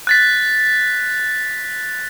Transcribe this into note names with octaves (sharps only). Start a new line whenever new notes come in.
F#6 A6 B6